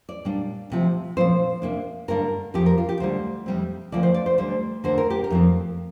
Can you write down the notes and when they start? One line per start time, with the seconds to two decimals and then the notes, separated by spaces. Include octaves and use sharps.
0.09 D5
0.25 A#2 G3 D4
0.70 D2 C3 F3
1.17 A#2 F3 C4 C5
1.62 C3 A#3 D4
2.08 G2 D3 A#3 D4 A#4
2.54 F2 F3 C4 G4
2.66 A#4
2.78 F4
2.89 G4
3.00 D2 D3 G3 C5
3.46 F2 C3 G3 C4
3.92 D2 C3 F3 A#3 D5
4.03 C5
4.14 D5
4.26 C5
4.38 D2 D3 G3 C5
4.84 D2 D3 A#3 C5
4.98 A#4
5.10 G4
5.24 A#4
5.30 F2 F3 C4